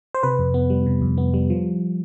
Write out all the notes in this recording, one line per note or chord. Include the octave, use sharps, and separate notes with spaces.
C5
C3 B4
F2
B3
G3
C3
F2
B3
G3
F3